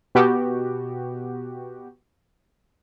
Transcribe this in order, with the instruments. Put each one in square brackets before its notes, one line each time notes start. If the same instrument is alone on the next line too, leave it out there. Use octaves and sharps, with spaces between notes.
[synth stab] B2 B3 F#4 G4